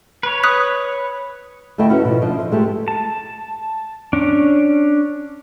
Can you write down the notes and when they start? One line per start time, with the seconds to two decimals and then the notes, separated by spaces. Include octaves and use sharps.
0.23 B4 C#5
0.43 D#6 F#6 B6
1.78 D2 A3 E4 D#5 G5
1.90 C#4 E4 F#4 B4
2.05 B2 F3
2.21 D3 F3 D4 D#5
2.35 E4 C5
2.52 G#3 A3 G4
2.88 A5
4.13 C#4 D4